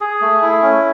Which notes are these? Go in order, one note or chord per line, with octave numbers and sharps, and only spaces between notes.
G#4
A3
E4
C#4